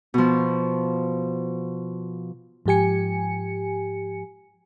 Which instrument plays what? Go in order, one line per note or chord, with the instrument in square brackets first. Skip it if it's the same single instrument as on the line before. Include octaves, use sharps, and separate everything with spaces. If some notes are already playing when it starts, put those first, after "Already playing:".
[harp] B2 F3
[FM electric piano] G#2 F3 G4 G#5 C#7